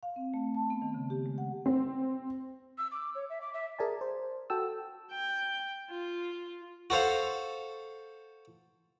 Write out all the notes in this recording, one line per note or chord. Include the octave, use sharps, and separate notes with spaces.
F5
C4
A3
A5
B3
D#3
C#3
G4
G#3
F#5
C4
E6
D6
C#5
E5
D6
E5
G#4 A#4 D5 G#5 A5
C5
F#4 A4 G5 A5 E6
G5
F4
F#4 A4 C5 F5